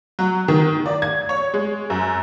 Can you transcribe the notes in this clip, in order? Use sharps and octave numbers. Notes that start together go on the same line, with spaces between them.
F#3
D#3
D5
G#6
C#5
G#3
F#2